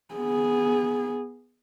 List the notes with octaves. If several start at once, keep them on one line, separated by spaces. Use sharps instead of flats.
B3 G#4